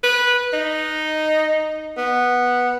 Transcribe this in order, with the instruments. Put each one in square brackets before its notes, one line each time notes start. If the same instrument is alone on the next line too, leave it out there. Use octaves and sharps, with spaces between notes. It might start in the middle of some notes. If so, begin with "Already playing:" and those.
[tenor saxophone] B4
D#4
B3